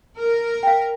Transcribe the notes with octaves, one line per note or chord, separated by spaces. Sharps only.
A#4
F5 G5